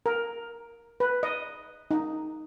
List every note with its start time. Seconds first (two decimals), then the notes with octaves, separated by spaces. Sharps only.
0.06 A#4
1.00 B4
1.23 D#5
1.91 D#4